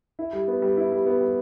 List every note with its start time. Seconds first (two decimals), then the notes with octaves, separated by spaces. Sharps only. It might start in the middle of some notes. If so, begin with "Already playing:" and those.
0.19 E4
0.33 G3
0.48 B3
0.62 G3
0.77 E4
0.92 G3
1.06 B3
1.21 G3